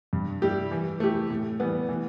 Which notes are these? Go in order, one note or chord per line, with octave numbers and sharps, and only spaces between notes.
G2
G3 E4 G4
E3
A3 E4 G4
A2
E3 G3 B3
E3